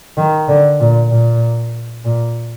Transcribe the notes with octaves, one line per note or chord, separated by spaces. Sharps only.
D#3
D3
A#2
A#2
A#2